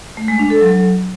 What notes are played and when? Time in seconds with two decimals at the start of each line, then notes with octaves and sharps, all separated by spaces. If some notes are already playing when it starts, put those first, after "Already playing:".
0.17 A3
0.28 G#3
0.39 D4
0.50 A4
0.61 F#3